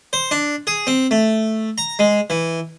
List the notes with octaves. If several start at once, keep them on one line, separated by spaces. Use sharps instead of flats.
C5
D4
G#4
C4
A3
A#5
G#3
E3